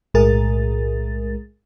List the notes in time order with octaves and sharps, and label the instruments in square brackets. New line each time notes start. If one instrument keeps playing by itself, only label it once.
[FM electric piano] B1 A2 G#3 G#4 A#4 A6